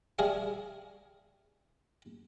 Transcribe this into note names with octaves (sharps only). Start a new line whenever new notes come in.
G3 G#4 A#4 E5 F5